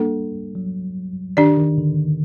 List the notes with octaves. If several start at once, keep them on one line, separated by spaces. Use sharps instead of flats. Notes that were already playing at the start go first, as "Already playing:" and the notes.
Already playing: G3 A#3 D4 A4
F#3
D#3 D4 G4 D5
D#3
D3